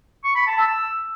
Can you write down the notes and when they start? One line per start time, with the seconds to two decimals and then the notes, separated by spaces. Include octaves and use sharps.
0.24 C#6
0.35 B5
0.47 A5
0.58 E6